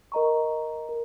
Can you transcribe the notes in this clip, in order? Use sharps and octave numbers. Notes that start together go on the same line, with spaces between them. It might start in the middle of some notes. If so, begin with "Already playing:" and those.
A#4 D#5 A#5 C#6
A#4